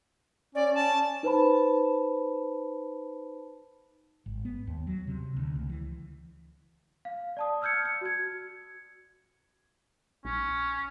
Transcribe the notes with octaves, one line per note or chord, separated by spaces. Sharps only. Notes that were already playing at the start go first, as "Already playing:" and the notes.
C#4 D5
C#4 A5
D#4 B4 C5 A5 B5
G#1
B3
D#2
F#3
C3
D2
C#2
E3
F5
D5 A5 D#6
E6 F6 G6 G#6 C#7
C#7
F#4 G#6
A#1 C#4